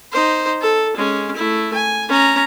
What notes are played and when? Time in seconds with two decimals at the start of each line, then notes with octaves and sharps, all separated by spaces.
0.12 D#4 C5
0.62 A4
0.97 G#3 C#4
1.36 A3 E4
1.73 G#5
2.09 C#4 A#5